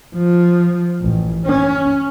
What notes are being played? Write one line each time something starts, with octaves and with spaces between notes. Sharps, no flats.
F3
A1
C#4